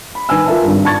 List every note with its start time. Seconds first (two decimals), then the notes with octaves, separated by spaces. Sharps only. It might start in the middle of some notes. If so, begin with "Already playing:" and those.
0.15 B5
0.29 D#3 B4 G#5 E6
0.46 F4 A#4 E5 A5
0.63 G#1 G2
0.85 A5 C#6 G#6 A6